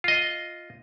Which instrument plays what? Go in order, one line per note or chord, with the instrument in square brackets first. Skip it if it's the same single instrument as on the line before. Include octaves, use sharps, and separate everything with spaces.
[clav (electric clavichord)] F4 D#5